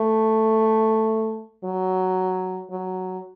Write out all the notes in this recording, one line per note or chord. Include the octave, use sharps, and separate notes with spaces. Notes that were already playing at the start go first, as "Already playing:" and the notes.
Already playing: A3
F#3
F#3